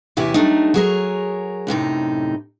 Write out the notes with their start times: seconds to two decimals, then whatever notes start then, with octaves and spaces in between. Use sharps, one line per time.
0.17 E2 C3 C#4 E4 G4
0.34 F#3 G3 A3 D4 D#4
0.74 F#3 G#4 A#4 C#5
1.67 F#2 A2 C3 D#4